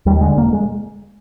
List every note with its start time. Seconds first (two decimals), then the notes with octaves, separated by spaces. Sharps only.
0.06 D#2 G3
0.21 D3 G#3
0.37 E1 A#3
0.53 G#3